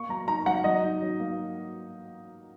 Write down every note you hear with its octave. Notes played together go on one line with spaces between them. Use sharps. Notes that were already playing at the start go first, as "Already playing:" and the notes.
Already playing: A#3 C#6
F#3 A#5
D#4 A#5
F#3 F#5
F#3 D#5
D#4
F#3
A#3